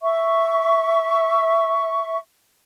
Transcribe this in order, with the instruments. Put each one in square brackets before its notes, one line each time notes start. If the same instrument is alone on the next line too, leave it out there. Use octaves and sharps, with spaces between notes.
[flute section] E5 C#6